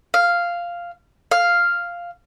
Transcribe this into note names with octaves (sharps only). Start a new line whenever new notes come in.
F5
F5